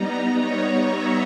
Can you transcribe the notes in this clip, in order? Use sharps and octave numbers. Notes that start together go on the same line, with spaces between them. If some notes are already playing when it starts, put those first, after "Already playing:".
Already playing: G3 B3 D#4 A#5
C#5
E5